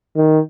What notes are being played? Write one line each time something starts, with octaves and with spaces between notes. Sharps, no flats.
D#3